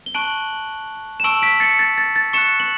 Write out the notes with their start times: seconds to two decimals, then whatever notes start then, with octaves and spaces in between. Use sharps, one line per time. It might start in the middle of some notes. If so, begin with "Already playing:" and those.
0.06 G7
0.15 A5 C#6 F#6 D7 F#7
1.20 E7
1.24 A5 C#6 E6 D7 F#7
1.42 B6 D7
1.60 A6 C#7
1.79 A6
1.98 A6
2.16 A6
2.33 C#6 F#6 C#7 E7
2.60 F#7